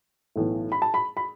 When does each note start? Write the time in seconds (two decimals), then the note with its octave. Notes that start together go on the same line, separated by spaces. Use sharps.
0.36 B1 A2 E3 B3
0.72 B5
0.82 A5
0.94 B5
1.17 B5